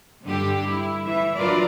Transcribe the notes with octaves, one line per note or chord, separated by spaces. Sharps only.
G2 D3 G3 D4 G4
E4
E3 E5
F#3 D4 F4 A#4 B4 D5